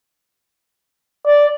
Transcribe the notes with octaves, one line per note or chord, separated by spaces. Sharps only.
D5